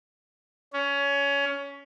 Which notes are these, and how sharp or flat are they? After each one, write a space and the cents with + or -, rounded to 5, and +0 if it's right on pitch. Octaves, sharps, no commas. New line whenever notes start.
C#4 +20